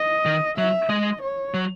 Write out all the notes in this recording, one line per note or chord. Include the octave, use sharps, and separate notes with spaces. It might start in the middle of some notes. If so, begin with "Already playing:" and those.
Already playing: D#5
D#3
F#3 E5
G#3 D#5
C#5
F#3